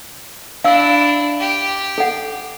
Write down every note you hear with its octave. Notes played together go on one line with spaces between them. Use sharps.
D4 E4 F5 E6
G4
A4 F#5